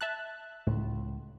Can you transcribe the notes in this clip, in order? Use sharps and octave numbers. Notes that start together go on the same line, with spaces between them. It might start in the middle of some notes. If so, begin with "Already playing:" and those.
E5 A5 F#6
C#2 A2